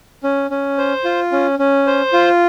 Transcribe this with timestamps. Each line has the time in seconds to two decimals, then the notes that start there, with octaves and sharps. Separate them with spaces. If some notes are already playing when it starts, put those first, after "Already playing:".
0.24 C#4
0.51 C#4
0.78 C5
1.04 F4
1.32 C#4
1.59 C#4
1.87 C5
2.13 F4